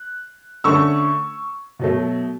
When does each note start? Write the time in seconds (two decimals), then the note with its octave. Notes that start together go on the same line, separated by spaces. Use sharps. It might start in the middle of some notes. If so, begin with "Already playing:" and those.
Already playing: F#6
0.64 D3 A3 C#4 C#6 E6
1.79 B2 F#3 A3